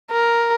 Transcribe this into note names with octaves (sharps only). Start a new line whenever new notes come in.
A#4